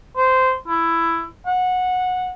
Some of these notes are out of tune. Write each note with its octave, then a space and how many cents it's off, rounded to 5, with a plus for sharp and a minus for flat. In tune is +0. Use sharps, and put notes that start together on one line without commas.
C5 -15
E4 +10
F#5 -15